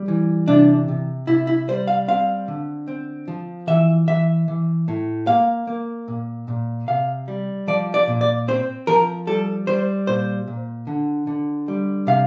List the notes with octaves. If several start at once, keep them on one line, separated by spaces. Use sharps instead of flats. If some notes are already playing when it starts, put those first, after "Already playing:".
Already playing: G3
E3
C3 D4
C3
C3 E4
E4
G3 C5
F5
C4 F5
D3
C4
F3
E3 E5
E3 E5
E3
A2
A#3 F5
A#3
A#2
A#2
C3 F5
G3
F3 D5
D5
A#2
D5
C4 C5
F3 A#4
G3 A4
G3 C5
A#2 C5
A#2
D3
D3
G3
C3 F5